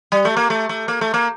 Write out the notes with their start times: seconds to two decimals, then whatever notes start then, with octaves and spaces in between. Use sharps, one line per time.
0.12 G3
0.25 A3
0.37 A#3
0.50 A3
0.69 A3
0.88 A#3
1.01 A3
1.14 A#3